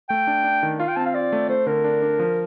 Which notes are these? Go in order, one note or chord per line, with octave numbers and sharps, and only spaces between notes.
A3 G5
D4
D4
D#3
F4 F5
G5
C4 A5
F5
F4 D5
A3
A3 C5
D3 A#4
D4
D4
F3